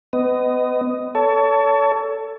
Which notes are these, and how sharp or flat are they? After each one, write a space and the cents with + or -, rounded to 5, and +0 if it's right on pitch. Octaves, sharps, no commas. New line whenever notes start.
B3 +35 D#5 +0
A4 +10 C#5 +35